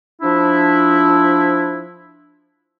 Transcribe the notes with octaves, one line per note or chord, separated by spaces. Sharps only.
F3 D4 E4